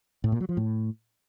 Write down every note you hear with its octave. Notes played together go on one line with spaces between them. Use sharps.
A2
A#2
F#3
F3
A2